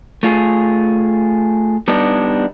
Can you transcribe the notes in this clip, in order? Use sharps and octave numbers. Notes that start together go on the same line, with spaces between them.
A3 F4 G#4
G3 B3 D4 D#4